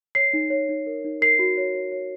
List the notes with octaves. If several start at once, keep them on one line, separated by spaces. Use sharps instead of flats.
C#5 C7
D#4
C#5
D#4
A#4
D#4
A#4 C7
F#4
C#5
C#5
C#5